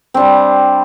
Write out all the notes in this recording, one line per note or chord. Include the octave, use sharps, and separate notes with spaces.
G3 C4 D4